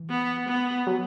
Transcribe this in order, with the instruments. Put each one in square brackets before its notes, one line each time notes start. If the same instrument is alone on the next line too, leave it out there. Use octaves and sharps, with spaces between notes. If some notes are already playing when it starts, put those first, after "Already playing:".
Already playing: [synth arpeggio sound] E3
[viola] B3
B3
[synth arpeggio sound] F#3